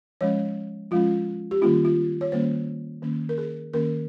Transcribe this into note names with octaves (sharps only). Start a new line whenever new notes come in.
F3 G#3 C#4 C#5
F3 G#3 C#4 F4
G4
D#3 G3 A#3 C#4 F4
F4
C#5
D#3 G3 A#3 C#4 C5
D#3 A#3 C#4
A#4
G#4
D#3 A#3 C#4 A#4